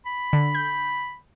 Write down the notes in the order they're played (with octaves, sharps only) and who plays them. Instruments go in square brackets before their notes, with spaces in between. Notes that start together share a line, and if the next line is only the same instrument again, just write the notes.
[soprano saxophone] B5
[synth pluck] D3
G6